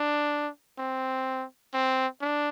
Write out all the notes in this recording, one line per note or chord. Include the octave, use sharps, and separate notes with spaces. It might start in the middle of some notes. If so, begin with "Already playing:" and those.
Already playing: D4
C4
C4
D4